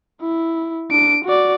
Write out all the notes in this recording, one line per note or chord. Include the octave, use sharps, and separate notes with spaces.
E4
D4 D7
F#4 D5